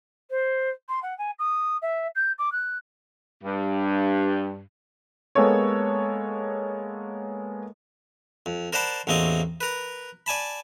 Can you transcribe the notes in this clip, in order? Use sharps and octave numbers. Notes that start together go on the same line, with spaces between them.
C5
C6
F#5
G#5
D#6
E5
G6
D6
F#6
G2
G#3 A#3 B3 A4 C#5
F2
A#4 C5 D5 F#5 A5 B5
A1 E2 A#3 C4 D#5 C#6
A#4 B4
D5 G#5 A5 B5